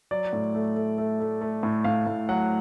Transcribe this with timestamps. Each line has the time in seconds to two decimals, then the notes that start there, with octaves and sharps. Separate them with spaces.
0.11 F#3 D5
0.33 A2
0.54 A3
0.76 A3
0.98 A3
1.20 A3
1.41 A3
1.63 A2
1.84 A2 F5
2.07 A2
2.29 F#3 F#5